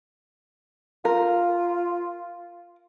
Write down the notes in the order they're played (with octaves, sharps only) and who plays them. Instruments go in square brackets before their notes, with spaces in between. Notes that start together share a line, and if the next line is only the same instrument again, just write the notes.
[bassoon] F4 [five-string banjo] A#4